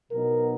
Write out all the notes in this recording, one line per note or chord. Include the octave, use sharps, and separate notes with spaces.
B2 F#3 B3 D#4 A#4